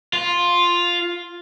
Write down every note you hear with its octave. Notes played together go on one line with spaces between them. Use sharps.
F4